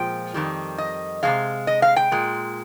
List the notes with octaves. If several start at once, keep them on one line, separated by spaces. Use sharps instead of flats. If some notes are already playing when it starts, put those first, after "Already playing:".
Already playing: A#2 F3 G#3 G5
F2 D#3 G3
D#5
C3 F3 G#3 F5
D#5
F5
G5
A#2 G#3